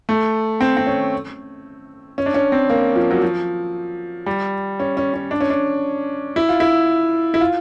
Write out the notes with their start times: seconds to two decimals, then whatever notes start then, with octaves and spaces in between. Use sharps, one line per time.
0.09 A3
0.61 C4
0.77 C4
0.86 C#4
2.18 C#4
2.26 D4
2.34 C#4
2.52 C4
2.69 A#3
2.96 F3
3.11 F#3
3.22 F3
4.26 G3
4.80 C#4
4.97 C#4
5.14 C#4
5.31 D4
5.41 C#4
5.50 D4
6.36 E4
6.49 F4
6.60 E4
7.34 E4
7.41 F4